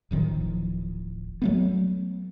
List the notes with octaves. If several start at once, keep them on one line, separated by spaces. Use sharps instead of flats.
D1 A1 D#3 F3
F#3 A3 B3